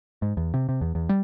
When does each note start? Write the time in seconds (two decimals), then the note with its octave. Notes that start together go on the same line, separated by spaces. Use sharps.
0.22 G#2
0.37 E2
0.54 C3
0.69 C3
0.81 E2
0.95 E2
1.09 G3